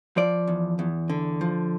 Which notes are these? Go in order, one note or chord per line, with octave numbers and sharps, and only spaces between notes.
F3 D5
E2
E2
D3
F3